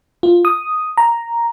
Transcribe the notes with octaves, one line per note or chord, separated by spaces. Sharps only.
F4
D#6
A#5